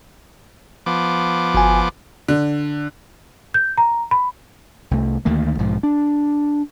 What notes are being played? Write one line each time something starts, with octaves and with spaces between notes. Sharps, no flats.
F3 B3 D6
G1 G#5
D3
G6
A#5
B5
C2 A3
D2 D#3 A3 A#3
B1 G#2 F3
D4